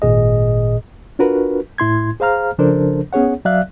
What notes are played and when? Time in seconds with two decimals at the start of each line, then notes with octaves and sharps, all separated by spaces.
0.02 G#1 A#2 G#4 D#5
1.19 D4 F4 F#4 A#4 B4
1.78 A2 E4 C6 G#6
2.20 G#4 C5 F5 A#5 F6
2.58 C#3 F3 D4 A4 A#4 C5
3.13 B3 C#4 G#4 C#5 F#5
3.45 F#3 D5 E5 F5 F#6